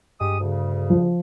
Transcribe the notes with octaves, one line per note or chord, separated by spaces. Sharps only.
G2 G#3 G4 D#6
D2 C#3
F3